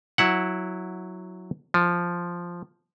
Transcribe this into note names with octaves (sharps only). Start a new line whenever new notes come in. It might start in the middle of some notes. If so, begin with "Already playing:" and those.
F#3 E4 F#5
F3